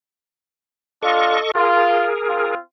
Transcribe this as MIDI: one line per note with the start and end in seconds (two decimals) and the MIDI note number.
1.03 1.38 62
1.03 1.38 65
1.03 1.51 69
1.03 1.51 75
1.03 1.51 85
1.55 2.08 65
1.55 2.55 68
1.55 2.55 70
2.27 2.59 60
2.27 2.59 65